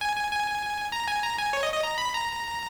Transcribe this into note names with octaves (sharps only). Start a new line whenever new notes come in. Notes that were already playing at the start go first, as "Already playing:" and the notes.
G#5
G#5
G#5
A#5
G#5
A#5
G#5
C#5
D#5
D#5
A#5
B5
A#5